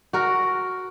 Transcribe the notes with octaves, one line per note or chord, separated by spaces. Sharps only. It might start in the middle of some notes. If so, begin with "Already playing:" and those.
F#4 A#4